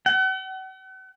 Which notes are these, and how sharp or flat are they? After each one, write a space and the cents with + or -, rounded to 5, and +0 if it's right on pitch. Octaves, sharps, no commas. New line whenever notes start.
F#5 +45